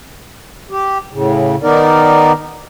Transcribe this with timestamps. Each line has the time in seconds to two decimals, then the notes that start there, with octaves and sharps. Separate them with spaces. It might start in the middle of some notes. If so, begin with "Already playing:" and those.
0.71 G4
1.13 A2 C#3
1.63 D#3 B3 D#4 A#4 D5